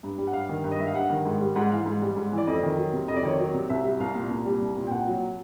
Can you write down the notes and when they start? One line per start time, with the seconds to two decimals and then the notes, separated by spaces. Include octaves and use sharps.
0.03 G2
0.18 G3
0.27 F#5
0.33 G2 F5
0.49 D#3
0.64 G2
0.72 D#5
0.79 G3 E5
0.87 F5
0.94 G2 F#5
1.10 D#3
1.25 G#2
1.40 G3
1.55 G#2 F#5
1.71 E3 F5
1.86 G#2
2.02 G3
2.16 G#2
2.32 E3
2.38 D5
2.47 F2 D#5
2.63 D#3
2.77 F#3
2.93 C3
3.08 F2 D#5
3.16 D5
3.23 D#3 C#5
3.33 D5
3.39 F#3
3.54 C3
3.69 C2 E5
3.84 G3
4.00 C2 F5
4.15 A#2
4.31 C2
4.46 G3
4.61 C2
4.76 A#2
4.87 G5
4.91 C2 F#5
5.07 F#3